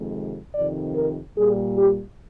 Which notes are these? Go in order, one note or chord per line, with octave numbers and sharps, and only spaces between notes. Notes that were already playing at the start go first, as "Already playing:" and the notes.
Already playing: F2 C3 D#3 G#3
F2 C3 D#3 D5
A#4
A#2 G3 G#4
G4